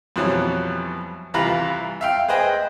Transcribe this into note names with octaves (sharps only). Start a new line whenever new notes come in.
F2 B2 E3 F#3 G3
C2 E3 G3 F4 A#5 B5
E5 F5 G5
G#4 B4 C5 D#5 G5 G#5